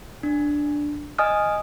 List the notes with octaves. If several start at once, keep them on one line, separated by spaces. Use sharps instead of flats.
D4
D#5 G#5 D#6 F6